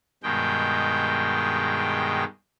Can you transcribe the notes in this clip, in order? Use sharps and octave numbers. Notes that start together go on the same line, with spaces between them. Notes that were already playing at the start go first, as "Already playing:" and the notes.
G2 B2 D#3 G#3 G5